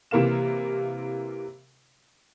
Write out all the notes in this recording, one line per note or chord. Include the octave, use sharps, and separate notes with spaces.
C3 E3 A#3 A#4 F5 E7